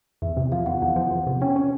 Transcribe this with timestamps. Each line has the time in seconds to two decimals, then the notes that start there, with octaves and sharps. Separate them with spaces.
0.22 E2 E5
0.37 C3
0.52 F3 F5
0.66 E2 F#5
0.82 E2
0.96 F3
1.11 E2
1.27 C3
1.41 C#4 G5
1.56 C#4